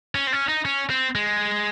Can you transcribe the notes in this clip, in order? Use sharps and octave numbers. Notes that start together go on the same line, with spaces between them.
C#4
C4
C#4
D#4
C#4
C4
G#3